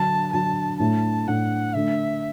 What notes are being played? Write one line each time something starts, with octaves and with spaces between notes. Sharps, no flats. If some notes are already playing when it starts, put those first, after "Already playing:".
Already playing: D3 F#3 D4 A5
D3 F#3 D4 A5
A2 A3 D4 A5
A2 A3 D4 F#5
D3 A3 D4 E5